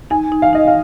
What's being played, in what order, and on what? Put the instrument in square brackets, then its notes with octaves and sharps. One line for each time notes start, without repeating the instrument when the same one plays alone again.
[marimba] D#4 [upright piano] G#5
[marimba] D#4
[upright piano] F5
[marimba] D#4 [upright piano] D#5
[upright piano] F5